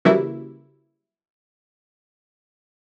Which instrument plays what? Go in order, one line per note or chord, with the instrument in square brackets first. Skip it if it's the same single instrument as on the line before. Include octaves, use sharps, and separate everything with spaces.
[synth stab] C#3 E3 F#3 G3 A#3 E4